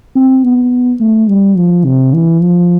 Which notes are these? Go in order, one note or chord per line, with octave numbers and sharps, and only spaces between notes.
C4
B3
A3
G3
F3
C3
E3
F3